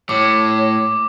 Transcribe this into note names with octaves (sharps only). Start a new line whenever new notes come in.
A2 C#5 D6